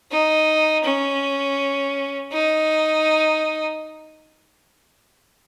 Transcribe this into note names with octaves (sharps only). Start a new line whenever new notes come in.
D#4
C#4
D#4